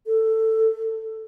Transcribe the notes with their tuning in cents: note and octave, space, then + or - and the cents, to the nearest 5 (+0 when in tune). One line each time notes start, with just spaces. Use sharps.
A4 +10